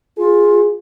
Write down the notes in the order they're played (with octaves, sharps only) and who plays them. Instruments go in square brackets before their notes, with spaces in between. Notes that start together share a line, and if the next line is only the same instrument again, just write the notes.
[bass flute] F4 [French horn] G#4